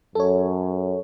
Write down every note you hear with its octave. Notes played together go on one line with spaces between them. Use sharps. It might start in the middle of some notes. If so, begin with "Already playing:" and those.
F#2 A4 C#5